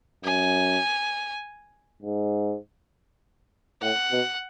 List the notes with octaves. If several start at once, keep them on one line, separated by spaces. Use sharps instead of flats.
F#2 G#5
G#2
A2 F#5
B2